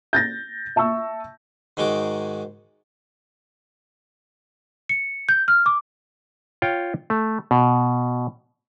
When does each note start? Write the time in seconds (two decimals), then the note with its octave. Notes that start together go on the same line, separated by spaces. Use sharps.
0.13 G6 A6 A#6
0.76 E5 A5 C#6 E6
1.77 G#2 D#3 G#3 F#4 D6
4.89 C#7
5.29 G6
5.48 F6
5.66 D6
6.62 F4 C#5 G5
7.10 A3
7.51 B2